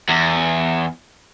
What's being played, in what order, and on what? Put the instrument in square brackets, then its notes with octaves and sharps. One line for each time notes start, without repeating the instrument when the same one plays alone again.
[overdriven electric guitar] E2